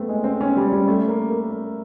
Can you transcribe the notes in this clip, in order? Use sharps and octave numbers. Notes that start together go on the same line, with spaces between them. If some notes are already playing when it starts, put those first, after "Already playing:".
Already playing: A3 B3 C4
G#3
C4
C#4
G3
G3
A3
A#3
A#3
A#3